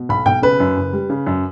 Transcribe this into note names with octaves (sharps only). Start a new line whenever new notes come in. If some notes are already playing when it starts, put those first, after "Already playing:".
Already playing: B2
B1 B5
B1 G5
C#3 B4
F#2
F#1
G3
C#3
F#2